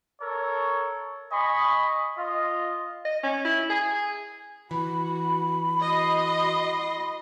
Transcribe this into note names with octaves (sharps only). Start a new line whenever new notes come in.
A4 A#4 C#5
D#5 G#5 B5 C#6
F4 D#5
D#5
C#4
E4
G#4
E3 F#4 B5
F#4 D#5 C6